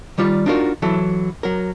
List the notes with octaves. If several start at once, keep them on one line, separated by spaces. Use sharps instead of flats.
D#3 G3 F4 D5
D4 D#4 F4 F#4 A#4
E3 F#3 E4 A4
F#3 A#4